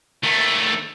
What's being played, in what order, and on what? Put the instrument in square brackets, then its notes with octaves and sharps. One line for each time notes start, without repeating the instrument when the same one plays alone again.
[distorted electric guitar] D#3 A3